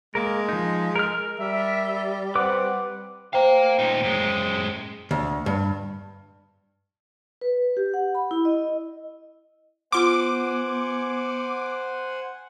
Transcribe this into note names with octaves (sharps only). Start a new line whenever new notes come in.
G#3 A#3 A#4
F3 D#4
A#4 F6
G3 E5
C4 B4 F#5 D6
C5 F5 G5 A#5
A#2 D#4
F#2 G#3
D2
G2
B4
G4
F#5
B5
E4
D#5
B3 F4 C5 F#5 G#5 C6 D6